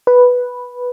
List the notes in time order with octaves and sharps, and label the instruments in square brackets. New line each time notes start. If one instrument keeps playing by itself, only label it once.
[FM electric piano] B4